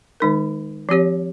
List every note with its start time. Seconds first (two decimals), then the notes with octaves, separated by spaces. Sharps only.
0.20 D#3 G#3 D#4 A#4
0.89 F3 C4 G4 C#5